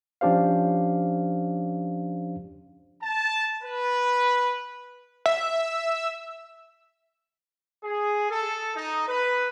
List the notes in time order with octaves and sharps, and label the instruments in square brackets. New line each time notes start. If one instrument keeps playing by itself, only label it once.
[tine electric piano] F3 C#4 D4 G4 C5 F5
[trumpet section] A5
B4
[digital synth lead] E5
[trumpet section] G#4
A4
D#4
B4